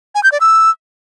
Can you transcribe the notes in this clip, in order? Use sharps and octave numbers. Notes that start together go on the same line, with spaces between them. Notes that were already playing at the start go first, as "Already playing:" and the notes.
G#5
G6
D5
E6